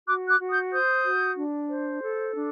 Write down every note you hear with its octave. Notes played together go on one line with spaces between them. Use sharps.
F#4 D6 F#6
D6 F#6
F#4
D#6 G6
C5 D#6 G6
F#4
D4
C5
A4
D4